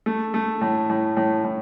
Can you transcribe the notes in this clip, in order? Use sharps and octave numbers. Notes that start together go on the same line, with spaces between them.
A3
A3
A2
A2
A2
A2